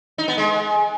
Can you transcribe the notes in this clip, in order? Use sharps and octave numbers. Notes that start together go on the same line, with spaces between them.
D#4
B3
G#3